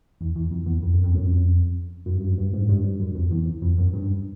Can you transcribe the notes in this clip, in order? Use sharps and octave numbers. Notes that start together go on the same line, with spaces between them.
E2
E2
F2
E2
F2
F#2
F2
F#2
F2
F#2
G2
F#2
G2
G#2
G2
G2
F#2
F2
E2
F2
F#2
G2